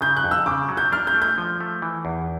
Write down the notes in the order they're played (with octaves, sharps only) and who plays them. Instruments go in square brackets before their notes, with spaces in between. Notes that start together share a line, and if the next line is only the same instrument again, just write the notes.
[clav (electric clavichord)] C#3 [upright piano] G6
[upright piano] F#6
[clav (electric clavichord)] F2
[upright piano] E6
[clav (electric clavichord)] C#3 [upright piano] D6
[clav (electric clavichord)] F#3
[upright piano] G6
[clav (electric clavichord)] D4 [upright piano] F6
[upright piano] G6
[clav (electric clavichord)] A3
[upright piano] G6
[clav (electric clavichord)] F3
A3
E3
E2